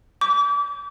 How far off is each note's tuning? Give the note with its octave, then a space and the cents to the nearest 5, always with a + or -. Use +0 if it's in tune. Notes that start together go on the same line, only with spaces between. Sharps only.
D6 -35